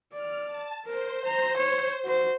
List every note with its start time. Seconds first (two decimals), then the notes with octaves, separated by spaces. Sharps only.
0.13 D5 F6
0.44 A5
0.85 A#4 C5
1.25 A#5
1.57 C#5
2.04 F#4 C5